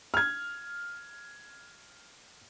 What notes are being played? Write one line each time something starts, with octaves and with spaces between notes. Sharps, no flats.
F6 G#6